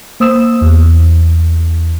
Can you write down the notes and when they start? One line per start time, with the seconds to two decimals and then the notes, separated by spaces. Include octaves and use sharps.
0.20 A#3 C5 D#6 E6 E7
0.61 E2